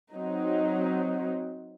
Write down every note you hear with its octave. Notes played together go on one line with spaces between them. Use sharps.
F#3 C4 D#4